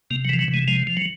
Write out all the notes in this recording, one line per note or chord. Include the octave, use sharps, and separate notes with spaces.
C3 A#3
F#3
E3 F3
F#3
C3
G#3
F3 G#3
F3
F#3